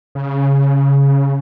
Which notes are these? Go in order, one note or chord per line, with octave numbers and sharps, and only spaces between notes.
C#3